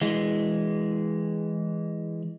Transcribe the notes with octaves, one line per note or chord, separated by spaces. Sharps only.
E3 G#3